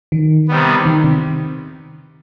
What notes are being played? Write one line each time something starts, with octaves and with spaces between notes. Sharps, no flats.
D#3
C3 D#3 G3 B3
D#3
C3